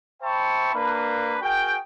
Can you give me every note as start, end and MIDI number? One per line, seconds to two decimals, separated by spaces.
0.23 0.73 72
0.23 0.73 76
0.23 0.73 79
0.23 0.73 81
0.23 0.73 83
0.23 0.73 85
0.75 1.37 58
0.75 1.37 62
0.75 1.37 71
1.42 1.78 66
1.42 1.78 68
1.42 1.78 70
1.42 1.78 79